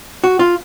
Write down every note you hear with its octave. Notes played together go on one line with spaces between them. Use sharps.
F#4
F4